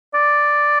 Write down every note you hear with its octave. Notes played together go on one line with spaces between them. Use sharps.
D5